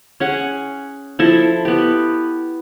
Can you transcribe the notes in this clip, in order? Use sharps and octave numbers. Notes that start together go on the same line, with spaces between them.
C#4 G#4 F#5
F3 E4 A4
B3 G4